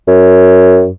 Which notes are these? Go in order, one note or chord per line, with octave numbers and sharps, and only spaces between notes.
F#2